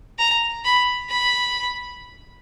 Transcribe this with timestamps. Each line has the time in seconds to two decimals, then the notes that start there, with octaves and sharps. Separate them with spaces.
0.19 A#5
0.65 B5
1.10 B5